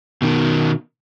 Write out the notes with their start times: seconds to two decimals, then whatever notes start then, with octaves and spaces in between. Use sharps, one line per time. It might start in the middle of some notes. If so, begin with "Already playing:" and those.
0.22 B2 D#3